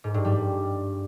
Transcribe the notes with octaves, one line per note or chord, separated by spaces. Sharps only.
G#2
G2
G3